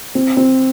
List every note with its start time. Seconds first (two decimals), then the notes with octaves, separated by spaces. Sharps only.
0.15 C4
0.37 C4